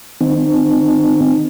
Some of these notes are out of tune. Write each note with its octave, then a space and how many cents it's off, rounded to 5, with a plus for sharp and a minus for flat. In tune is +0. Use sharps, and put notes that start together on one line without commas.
D#3 +0 C4 -20 D#4 -30